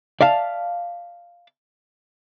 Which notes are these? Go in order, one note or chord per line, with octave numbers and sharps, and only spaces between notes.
D5 E5 F5 A5